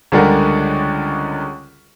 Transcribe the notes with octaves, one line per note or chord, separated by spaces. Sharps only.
C#2 D3 G3 G#3 A#4 F#5